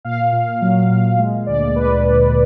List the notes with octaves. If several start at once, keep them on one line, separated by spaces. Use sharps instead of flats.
A#2 F5
A#2
F#3
A#2
G#3
D2 D5
G#3 B4
D2